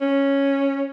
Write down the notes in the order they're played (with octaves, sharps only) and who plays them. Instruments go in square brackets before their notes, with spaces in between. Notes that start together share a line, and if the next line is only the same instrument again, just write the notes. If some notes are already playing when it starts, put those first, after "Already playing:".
[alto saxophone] C#4